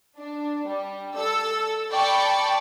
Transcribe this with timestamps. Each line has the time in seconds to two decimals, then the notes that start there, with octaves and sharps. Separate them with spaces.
0.18 D4
0.67 G3
1.15 A4 E6
1.90 D5 G5 A5 B5 C#6